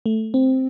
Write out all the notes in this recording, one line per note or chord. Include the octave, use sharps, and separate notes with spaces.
A3
C4